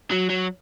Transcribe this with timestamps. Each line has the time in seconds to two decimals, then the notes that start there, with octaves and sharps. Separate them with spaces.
0.11 F#3
0.29 F#3